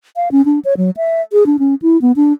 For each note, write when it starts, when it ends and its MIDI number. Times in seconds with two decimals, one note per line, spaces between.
0.16 0.29 77
0.32 0.44 61
0.45 0.59 62
0.65 0.74 73
0.77 0.91 54
0.97 1.22 76
1.32 1.46 68
1.46 1.57 62
1.59 1.75 61
1.82 2.00 64
2.02 2.12 59
2.16 2.33 62